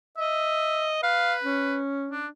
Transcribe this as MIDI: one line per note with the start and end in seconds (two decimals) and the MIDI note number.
0.17 0.98 75
0.17 0.94 76
1.03 1.79 71
1.03 1.34 77
1.44 2.25 61
2.11 2.28 62